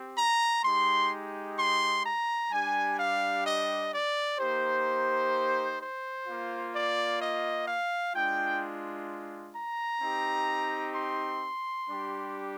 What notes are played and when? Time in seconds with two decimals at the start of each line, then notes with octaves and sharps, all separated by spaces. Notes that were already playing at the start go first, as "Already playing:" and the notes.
Already playing: C4 G4
0.16 A#5
0.63 G#3 D#4 G4 C6
1.58 C6
2.04 A#5
2.51 G3 D4 G4 G#5
2.98 F5
3.45 D#5
3.92 D5
4.39 A#3 D#4 G4 C5
5.80 C5
6.26 A#3 F4
6.73 D5
7.21 D#5
7.67 F5
8.14 G#3 D4 F4 G5
9.55 A#5
10.01 C4 D#4 G4
10.95 C6
11.89 G3 D4 G4